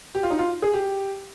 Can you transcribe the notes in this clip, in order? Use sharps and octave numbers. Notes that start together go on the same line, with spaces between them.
G4
F4
D#4
F4
G#4
G4